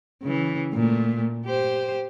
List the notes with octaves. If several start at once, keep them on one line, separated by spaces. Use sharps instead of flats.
C#3 E3
A#2 A3
G4 C5